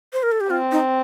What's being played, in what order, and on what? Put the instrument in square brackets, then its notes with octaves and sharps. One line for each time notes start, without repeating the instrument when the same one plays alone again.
[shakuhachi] C5
A#4
A4
G4
[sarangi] C4 [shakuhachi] F4
[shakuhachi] D#4